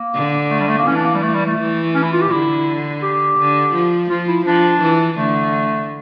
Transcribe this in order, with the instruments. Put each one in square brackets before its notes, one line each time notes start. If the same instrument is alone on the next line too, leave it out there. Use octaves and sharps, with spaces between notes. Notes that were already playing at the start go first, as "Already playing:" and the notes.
Already playing: [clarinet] A#3
[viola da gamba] D3
[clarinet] A3
G3
A3
A#3
[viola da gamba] E3 [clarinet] C#4
[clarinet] D4
A#3
G3
A3
G3
A3
[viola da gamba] E3
[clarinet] C#4
E4
F4
G4
[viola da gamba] D3 [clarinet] E4
[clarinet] G4
[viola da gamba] D3
F3
[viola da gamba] F3 [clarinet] F4
[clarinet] E4
[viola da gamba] F3 [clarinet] D4
[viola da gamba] E3
[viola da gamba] D3 [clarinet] A3